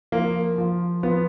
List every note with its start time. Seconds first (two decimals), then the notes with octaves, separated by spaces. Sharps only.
0.12 F3 A#3
0.58 F3
1.03 F3 B3